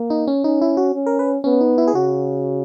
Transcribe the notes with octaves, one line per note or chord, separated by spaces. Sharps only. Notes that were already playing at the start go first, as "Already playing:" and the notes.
Already playing: A#3
D#4
C#4
C#4 D#4
E4
F#4
C#4
A#4
B4
B3 C#4
D#4
E4
G#4
C#3 F#4